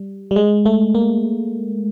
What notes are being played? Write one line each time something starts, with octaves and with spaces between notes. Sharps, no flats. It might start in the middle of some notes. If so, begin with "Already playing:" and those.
Already playing: G3
G3
G#3
A3
A#3